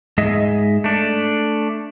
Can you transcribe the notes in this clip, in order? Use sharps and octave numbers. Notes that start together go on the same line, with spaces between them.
G#2 G#3 G#4 D#5 E5
A3 D4